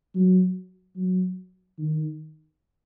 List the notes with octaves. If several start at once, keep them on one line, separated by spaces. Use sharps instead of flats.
F#3
F#3
D#3